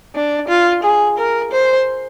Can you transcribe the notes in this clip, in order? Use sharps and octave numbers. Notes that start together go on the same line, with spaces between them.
D4
F4
G#4
A#4
C5